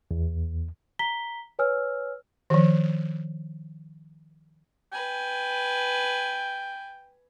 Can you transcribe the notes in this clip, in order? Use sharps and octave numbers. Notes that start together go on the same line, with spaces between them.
E2
A#5 B6 G7
B4 C#5 G#5 E6 F6
D#3 F3
B4 G5 G#5